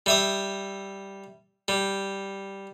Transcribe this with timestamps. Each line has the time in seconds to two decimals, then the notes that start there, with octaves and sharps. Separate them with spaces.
0.06 G3 E5 D#6
1.68 G3